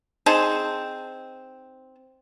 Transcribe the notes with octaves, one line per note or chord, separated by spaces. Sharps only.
C4 D#4 G#4 A5